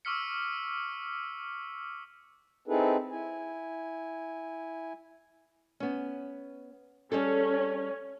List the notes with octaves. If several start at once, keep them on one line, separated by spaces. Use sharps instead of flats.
C#6 D6 E6 F6 B6 C#7
C4 D#4 E4 G#4 A4 B4
E4 G#5
B3 C#4
G3 C#4 G#4 A4